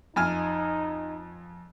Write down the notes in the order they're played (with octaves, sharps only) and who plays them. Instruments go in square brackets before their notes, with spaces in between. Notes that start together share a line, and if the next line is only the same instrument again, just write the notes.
[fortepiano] F2 G#5 F6 [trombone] D#4